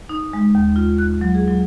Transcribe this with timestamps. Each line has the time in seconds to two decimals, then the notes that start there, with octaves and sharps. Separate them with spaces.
0.09 D#4
0.33 G#3
0.55 D#2
0.76 F4
0.99 F#6
1.21 F#3
1.35 G#4
1.48 F#3